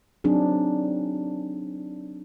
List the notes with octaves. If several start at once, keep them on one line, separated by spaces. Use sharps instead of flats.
F#3 C4 D4 D#4 G#4